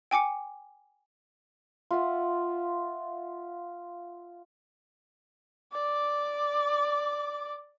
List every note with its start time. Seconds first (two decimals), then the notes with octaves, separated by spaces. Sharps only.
0.11 G5 G#5 D6 C#7
1.91 F4 E5 F#5
5.73 D5 D6